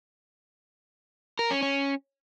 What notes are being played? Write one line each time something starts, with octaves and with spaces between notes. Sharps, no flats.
A#4
C#4
C#4